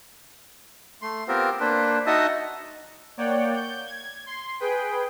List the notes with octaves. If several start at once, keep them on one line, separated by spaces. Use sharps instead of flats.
A3 C6
B3 C4 F4 G4 A#4 C5
A#3 D4 B4 C5
D#4 F#4 D#5 E5 A5
A#3 C#5 D5 F#5 G5
G6
G#6
C6
G#4 B4 G5